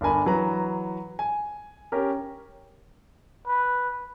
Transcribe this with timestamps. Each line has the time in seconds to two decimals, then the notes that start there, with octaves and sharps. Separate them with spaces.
0.01 G1 D4 A#4 G#5 B5
0.25 E3 F#3 B4 A#5
1.19 G#5
1.92 C#4 G4 A#4
3.47 B4